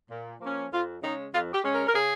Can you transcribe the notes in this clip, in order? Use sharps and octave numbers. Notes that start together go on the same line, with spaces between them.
A#2
F3 A#3 C#4
F2 F4
C#3 G#3 C#4 D#4
F2 F4
G4
C#3 G#3 C#4
A#4
A#4
C#3 G#4